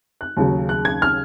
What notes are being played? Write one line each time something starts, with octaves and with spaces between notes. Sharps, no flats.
F#6
D#2 C#3 F#3
F#6
G#6
F6